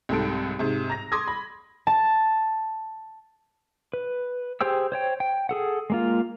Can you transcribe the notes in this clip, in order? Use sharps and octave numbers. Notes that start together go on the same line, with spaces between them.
C2 G#2 G#3 A4 D7
G#2 C3
A#5 A#6
C6 D6 D#6 G#6 A#6
B5
A5
B4
G4 G#4 C5 G5 E6
C5 C#5 G5
G5
G#4 A4 F#5
G#3 A#3 F4